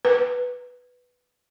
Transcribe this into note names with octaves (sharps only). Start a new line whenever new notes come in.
B4